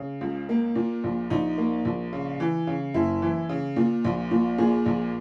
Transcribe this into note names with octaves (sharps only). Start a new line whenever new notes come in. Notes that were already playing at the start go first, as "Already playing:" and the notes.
Already playing: C#3
C#2
A#3
A#2
A#1
A#1 D#4
A#3
A#1
C#3
E3
C#3
F#1 E4
E3
C#3
A#2
A#1
A#2
A#2 G#4
A#1